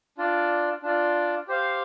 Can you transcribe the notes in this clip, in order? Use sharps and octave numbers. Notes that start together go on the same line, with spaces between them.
D4 F4 D5
D4 F4 D5
G4 C5 F5